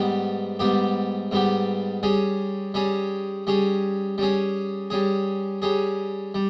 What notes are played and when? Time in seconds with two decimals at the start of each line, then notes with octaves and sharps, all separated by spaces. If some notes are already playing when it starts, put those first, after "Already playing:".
Already playing: G#2 G3 B3 G4
0.59 G#2 G3 B3 G4
1.31 G#2 G3 B3 G4
2.03 G3 C#4 G#4
2.74 G3 C#4 G#4
3.47 G3 C#4 G#4
4.18 G3 C#4 G#4
4.90 G3 C#4 G#4
5.62 G3 C#4 G#4
6.34 G3